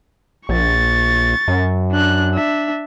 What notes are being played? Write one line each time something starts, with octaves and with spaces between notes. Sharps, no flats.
A#1 C#6 A6
F#2
D4 F#6
D4 E5